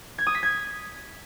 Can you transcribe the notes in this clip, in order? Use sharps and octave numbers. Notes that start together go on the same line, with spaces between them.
G#6
D#6
B6
G#6